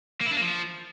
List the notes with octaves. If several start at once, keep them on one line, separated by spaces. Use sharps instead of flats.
A#3
E4
D4
A#3
F3